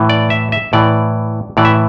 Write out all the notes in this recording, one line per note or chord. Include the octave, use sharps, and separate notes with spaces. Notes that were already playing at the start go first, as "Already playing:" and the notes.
Already playing: A2 E3
D5
E5
E5
A2 E3 D5
A2 E3 D5
E5